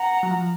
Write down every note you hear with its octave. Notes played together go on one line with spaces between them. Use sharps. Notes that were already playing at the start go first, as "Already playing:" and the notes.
Already playing: F#5 A#5
F#3
F3